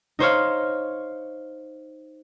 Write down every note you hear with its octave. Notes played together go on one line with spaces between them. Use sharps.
D#4 C5 C#5 F5